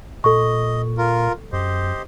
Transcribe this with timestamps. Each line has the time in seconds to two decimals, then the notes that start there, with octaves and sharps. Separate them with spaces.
0.24 A#2 A4 D#5 C#6
0.98 F4 A#4
1.53 F#2 G4 C5 D#5